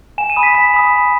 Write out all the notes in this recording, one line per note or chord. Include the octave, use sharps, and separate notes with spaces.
G#5 E7
D#7
B5 D#6
B6
G#5 B6
B5 D#6
B5